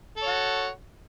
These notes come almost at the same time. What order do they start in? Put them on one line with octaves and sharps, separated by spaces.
A4 C#5 F#4